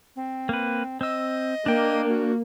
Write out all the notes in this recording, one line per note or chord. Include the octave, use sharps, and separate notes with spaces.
C4
A#3 B4
C4 D#5 E6
A#3 D4 G5
F#4